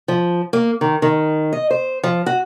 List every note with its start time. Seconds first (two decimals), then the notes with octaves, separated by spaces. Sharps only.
0.08 F3
0.53 A#3
0.81 D#3
1.02 D#3
1.53 D#5
1.70 C5
2.03 F3
2.26 F#4